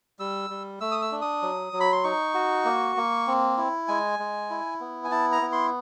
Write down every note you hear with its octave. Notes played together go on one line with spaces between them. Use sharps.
G3 E6
G3
A3 E6
D#6
E6
D4
D#6
F#3
F#3
B5
C6
D#4 C#6
F#4
A#3
A#3
C4
E4
G#3 G#5
G#3
E4
B3
G#5
E4 A5
A#5
B3
C6